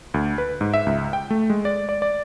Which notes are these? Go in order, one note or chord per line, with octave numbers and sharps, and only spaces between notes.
D2
B4
G#2
E5
C#2
G5
A3
G#3
D5
D5
D5